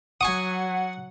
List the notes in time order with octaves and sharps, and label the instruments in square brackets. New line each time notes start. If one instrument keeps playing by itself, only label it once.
[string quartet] F#3 [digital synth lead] F#5 [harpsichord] G#5 C#6 D#6